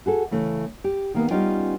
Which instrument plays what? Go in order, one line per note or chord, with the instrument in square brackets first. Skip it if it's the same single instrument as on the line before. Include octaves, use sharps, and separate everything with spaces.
[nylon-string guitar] F#4 G#4 A4
C#3 E3 A3
G4
D#3 A#3 B3
G3 B3 C#4 D#4 F4 G5